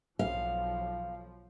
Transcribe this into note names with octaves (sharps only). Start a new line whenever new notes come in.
B1 F3 F5